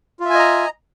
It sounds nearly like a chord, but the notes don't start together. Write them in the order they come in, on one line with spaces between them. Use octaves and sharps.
F4 E5 G#5 D#5 A#5